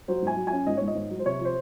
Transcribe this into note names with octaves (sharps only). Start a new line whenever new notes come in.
F#3 C5
G#2 G#5
F#3
G#5
C#4
G#2 D#5
G#2 C#5
D#5
G#2
F#3
C5
C3 C#5
F3 C5